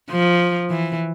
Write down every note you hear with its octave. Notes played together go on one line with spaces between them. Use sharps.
F3
E3